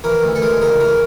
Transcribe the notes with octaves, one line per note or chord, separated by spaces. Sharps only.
E3 A#4
D2
A4
G#3 A#4
C#3 A#4
E3 A#4